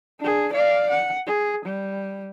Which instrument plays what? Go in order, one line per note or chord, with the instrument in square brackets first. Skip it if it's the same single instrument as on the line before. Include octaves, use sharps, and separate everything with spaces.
[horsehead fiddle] D4 G#4
D5 F5
F#5
G#4
G3